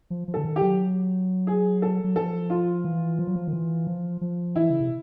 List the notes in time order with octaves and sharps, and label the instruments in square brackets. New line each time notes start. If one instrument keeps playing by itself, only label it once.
[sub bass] F3
F3
[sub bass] D3 [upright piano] A4
[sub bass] D#3
[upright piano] G4
[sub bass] F#3
[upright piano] G#4
A4
[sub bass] F#3
[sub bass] F3 [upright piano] A4
[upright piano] F4
[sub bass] E3
F3
F#3
F3
D#3
E3
F3
F3
[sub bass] E3 [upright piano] E4
[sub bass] C#3
C3